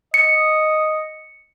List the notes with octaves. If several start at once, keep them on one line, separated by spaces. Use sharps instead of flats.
D#5 C#7